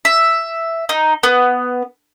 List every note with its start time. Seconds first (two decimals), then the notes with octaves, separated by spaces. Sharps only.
0.05 E5
0.89 D#4
1.23 B3